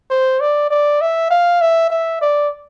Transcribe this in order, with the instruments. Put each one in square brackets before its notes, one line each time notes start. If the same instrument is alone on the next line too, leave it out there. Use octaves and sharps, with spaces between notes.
[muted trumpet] C5
D5
D5
E5
F5
E5
E5
D5